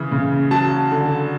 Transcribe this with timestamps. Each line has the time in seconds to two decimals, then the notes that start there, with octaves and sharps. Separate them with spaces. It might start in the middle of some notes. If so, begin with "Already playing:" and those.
Already playing: C#3 E3
0.12 C#3
0.51 F#3 A5
0.91 D3